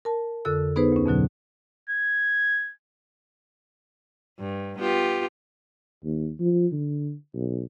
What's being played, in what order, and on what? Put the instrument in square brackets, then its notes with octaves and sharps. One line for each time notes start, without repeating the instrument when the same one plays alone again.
[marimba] A#4 A5
F2 D3 A4 E6
B3 D#4 G#4 B4 C5
D2 C#4
F2 B2 D3 F#3
[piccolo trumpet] G#6
[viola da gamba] G2
B3 F4 G4
[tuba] D#2
F3
D3
B1